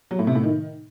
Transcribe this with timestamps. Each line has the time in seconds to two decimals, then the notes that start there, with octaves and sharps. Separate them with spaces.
0.11 F#3
0.19 A2
0.27 C3
0.35 A2
0.43 D#3